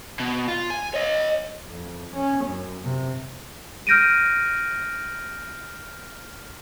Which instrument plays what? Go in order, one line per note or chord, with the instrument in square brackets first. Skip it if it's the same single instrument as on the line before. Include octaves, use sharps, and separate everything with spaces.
[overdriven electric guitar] B2
F4
G#5
C#5 D#5
[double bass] F2
C#4
F#2
C3
[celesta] F6 G6 A#6 D7 D#7